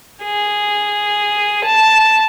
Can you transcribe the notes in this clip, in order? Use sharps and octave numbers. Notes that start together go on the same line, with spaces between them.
G#4
A5